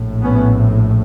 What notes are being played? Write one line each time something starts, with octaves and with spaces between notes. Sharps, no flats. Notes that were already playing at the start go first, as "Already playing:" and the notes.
Already playing: A#1 A2
B3 C#4